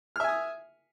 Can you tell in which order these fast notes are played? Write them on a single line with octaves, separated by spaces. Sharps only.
F6 E5 G#5 D#6